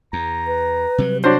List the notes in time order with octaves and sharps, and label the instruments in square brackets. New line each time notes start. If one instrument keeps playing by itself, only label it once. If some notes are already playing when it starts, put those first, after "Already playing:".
[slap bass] E2 [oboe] A#5
[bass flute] B4
[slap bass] C3 F#3 G3
[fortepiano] D4 F#4 C5 [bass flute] C#5